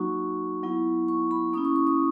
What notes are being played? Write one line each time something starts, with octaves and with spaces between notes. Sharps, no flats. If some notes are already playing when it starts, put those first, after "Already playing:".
Already playing: F#3 A#3 D#4 F#4 C#6
F#3 B3 E4
C#6
B5
A#3 C#4 E4 D#6
C#6
C#6
D#6